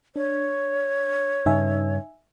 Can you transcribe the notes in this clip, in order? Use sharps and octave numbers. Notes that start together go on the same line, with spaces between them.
D4 C#5
G2 C#3 D#4 E5 G#5